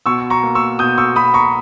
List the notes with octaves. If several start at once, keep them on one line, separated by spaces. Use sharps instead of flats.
B2 C#6 E6
A#5 C#6
A#3
C#6 E6
B2 D#6 G6
C#6 E6
B2 B5 D#6
A#5 C#6